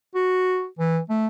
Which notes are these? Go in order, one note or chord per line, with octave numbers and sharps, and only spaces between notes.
F#4
E3
A3